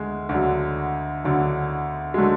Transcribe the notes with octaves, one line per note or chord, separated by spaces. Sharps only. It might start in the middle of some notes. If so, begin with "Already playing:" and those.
Already playing: D2 G#3
D2 D3 F#3
D2 D3 F#3
G#3
D3 F#3 A3